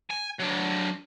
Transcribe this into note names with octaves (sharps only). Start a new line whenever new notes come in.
G#5
F#3 D4